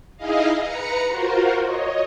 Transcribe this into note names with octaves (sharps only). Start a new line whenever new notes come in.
D#4 E4 G#4 D#5 F5
B4 A#5 C#7
F4 F#4 A#4 C5
C#5 D#5